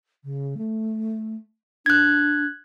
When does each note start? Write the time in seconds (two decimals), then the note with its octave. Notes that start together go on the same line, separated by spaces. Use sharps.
0.24 C#3
0.57 A3
1.86 D4 F#6 G#6